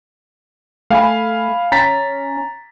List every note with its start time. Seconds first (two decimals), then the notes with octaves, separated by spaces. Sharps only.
0.90 A3 F5 G#5 B5
1.72 C#4 A#5 A6 B6